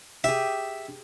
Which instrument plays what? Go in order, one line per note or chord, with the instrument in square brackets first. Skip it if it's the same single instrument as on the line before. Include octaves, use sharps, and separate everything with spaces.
[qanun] G4 G#4 [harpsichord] E5